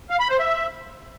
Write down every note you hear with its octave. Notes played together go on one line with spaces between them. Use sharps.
F5
B5
C5
E5